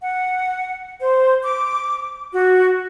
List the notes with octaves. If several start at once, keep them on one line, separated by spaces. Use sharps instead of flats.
F#5
C5
D6
F#4